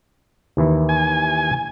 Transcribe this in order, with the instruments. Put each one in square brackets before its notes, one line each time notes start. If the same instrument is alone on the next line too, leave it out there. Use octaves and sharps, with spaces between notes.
[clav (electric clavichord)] D#2 E3 E4
[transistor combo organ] G#5